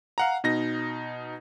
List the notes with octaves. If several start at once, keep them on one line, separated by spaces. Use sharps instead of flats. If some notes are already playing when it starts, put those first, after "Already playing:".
F5 F#5 A#5
B2 D#4 A#6